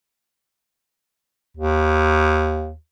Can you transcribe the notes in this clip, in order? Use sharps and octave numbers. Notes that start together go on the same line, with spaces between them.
D#2